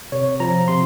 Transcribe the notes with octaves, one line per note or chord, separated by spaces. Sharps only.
C3 C#5
F3 A#5
C3 C6